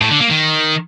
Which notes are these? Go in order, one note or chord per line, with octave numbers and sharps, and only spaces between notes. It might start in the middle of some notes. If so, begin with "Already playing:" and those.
A2
D3
A#3
D#3